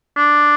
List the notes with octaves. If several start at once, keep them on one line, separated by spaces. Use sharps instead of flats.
D4